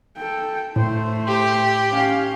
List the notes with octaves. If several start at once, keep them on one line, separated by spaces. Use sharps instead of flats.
A4 G5
A2 A3 C5
G4
C#4 F5